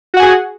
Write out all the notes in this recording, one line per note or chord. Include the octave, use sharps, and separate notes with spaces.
F#4 G#4 F#5 G#5